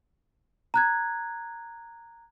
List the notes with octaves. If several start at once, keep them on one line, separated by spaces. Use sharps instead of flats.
A#5 F#6 G#6